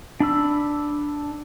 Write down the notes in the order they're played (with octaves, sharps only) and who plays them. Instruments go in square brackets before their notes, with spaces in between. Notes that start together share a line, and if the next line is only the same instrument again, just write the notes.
[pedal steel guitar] D4 B5 E6